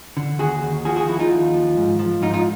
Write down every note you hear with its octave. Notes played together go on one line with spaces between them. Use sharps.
D3
D#2 F#4 G#4
D#2
F3 F#4 G#4
F#4 G#4
D#2 E4 F#4
D#4 F4
D#2
F3
G#2
F3
G#2 D#4 F4
D#4 F4